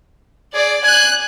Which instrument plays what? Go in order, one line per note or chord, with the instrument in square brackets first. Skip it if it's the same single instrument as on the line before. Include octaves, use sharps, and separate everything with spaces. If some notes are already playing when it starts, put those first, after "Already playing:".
[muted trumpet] G#4 [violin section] D5
[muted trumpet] G#5 [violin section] F#6